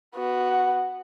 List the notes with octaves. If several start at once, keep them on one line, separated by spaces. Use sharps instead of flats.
B3 F#4